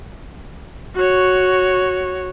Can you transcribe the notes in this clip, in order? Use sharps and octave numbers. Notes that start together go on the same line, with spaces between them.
F#4 C#5